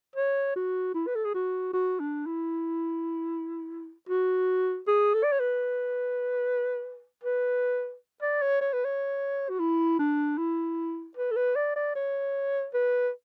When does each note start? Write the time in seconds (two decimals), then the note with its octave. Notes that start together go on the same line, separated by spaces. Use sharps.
0.16 C#5
0.56 F#4
0.95 E4
1.07 B4
1.15 A4
1.25 G#4
1.34 F#4
1.73 F#4
2.00 D4
2.26 E4
4.09 F#4
4.88 G#4
5.14 A4
5.24 D5
5.32 C#5
5.40 B4
7.24 B4
8.22 D5
8.42 C#5
8.61 C#5
8.73 B4
8.85 C#5
9.49 F#4
9.60 E4
9.99 D4
10.38 E4
11.17 B4
11.31 A4
11.36 B4
11.56 D5
11.76 D5
11.96 C#5
12.74 B4